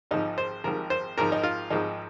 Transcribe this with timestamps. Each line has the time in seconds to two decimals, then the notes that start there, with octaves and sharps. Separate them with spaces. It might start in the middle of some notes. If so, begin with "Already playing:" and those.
0.11 G#1 G#2 F3 D#4
0.38 C5
0.64 G#1 G#2 F3 A#4
0.90 C5
1.18 G#1 G#2 F3 A#4
1.32 D#4
1.43 F4
1.70 G#1 G#2 F3 D#4